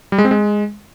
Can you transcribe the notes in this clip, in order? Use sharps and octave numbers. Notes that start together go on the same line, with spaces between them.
G3
G#3
C4
G#3